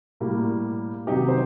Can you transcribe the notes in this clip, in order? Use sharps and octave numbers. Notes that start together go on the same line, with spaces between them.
A2 G3 A#3
C3 D#3 F#3 D#4 G4
C5